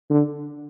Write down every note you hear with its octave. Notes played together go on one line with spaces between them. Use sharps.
D3